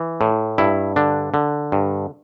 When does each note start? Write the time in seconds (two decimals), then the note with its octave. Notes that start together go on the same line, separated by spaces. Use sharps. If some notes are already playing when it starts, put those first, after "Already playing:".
Already playing: E3
0.21 A2
0.58 G2 E4
0.96 D3 D4
1.34 D3
1.72 G2